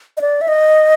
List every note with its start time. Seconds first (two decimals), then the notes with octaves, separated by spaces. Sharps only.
0.17 D#5
0.21 D5
0.41 E5
0.48 D#5